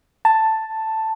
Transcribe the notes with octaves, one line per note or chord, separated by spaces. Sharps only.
A5